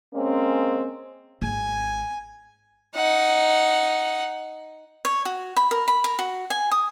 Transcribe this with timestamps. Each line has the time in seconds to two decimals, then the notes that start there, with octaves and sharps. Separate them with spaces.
0.14 G#3 A#3 C4 C#4
1.42 G#1 G#5
2.95 D#4 F#5
5.05 C#5
5.25 F#4
5.56 B5
5.71 A#4
5.88 B5
6.04 A#4
6.19 F#4
6.50 G#5
6.71 D#6